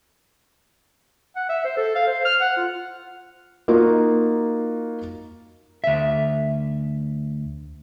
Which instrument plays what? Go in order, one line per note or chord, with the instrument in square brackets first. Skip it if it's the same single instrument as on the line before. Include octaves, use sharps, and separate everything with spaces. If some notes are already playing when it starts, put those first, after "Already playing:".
[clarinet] F#5
E5
C5
A4
F5
C5
F6
F#5
F4
[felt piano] A#3 D#4 F4 F#4
[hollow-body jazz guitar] D2 E5